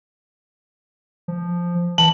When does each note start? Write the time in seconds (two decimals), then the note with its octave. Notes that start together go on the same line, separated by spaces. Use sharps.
1.28 F3
1.98 E3 A5 F#7